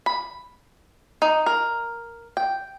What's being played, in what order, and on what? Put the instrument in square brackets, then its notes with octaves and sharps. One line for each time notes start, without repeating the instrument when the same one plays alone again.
[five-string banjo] B5
D#4
A#4
G5